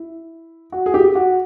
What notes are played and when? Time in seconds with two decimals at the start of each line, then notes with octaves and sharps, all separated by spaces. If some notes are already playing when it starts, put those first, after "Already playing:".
Already playing: E4
0.72 F#4
0.86 G#4
0.94 G4
1.15 F#4